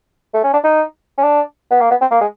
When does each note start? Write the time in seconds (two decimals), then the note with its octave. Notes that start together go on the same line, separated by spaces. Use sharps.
0.34 A3
0.44 C#4
0.53 D4
0.64 D#4
1.18 C#4
1.23 D4
1.71 B3
1.81 A#3
1.91 B3
2.01 C4
2.11 A#3
2.21 G#3